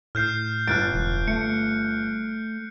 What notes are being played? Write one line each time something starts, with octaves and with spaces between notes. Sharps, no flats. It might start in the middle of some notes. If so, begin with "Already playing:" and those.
A2 F6 G6 C7
G1 F6 F#6 A6 D7
E1
A3 C#7